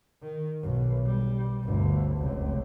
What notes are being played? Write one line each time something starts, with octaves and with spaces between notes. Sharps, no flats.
D#3
B1
G3
G1 D2
F1 C#2